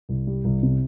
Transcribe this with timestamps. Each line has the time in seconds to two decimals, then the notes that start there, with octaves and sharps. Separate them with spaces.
0.09 C2
0.27 G3
0.44 C2
0.63 C3